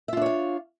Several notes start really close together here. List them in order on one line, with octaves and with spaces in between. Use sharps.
E5 F4 D4 C#5 F5